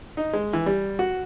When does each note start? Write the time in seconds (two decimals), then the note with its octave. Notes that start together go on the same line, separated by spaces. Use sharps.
0.17 D#4
0.33 G#3
0.53 E3
0.66 G3
0.99 F#4